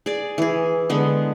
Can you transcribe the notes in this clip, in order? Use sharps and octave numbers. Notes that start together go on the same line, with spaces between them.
G#4 D5
E3 G#4
D3 G#3 B3